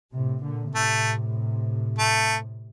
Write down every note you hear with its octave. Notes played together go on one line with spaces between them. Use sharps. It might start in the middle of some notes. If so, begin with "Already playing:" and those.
A2 C3
A#2 D3
A2 C3 A3
A3